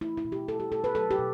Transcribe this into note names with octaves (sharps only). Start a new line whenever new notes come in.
A3 E4
E4
B2
G4
B2 A4
G4
B2 A4
B4
F#3 A4
G4
B2